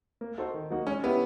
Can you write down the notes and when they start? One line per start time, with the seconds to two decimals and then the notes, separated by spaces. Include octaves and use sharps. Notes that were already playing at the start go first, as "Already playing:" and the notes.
0.21 A#3
0.38 D#4 F#4 A4 C5
0.54 D#3
0.70 F#3 A#3 D#4 F#4
0.87 G#3 C#4
1.03 B3 C#4 E4 G4